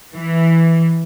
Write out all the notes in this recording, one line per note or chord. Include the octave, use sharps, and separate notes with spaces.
E3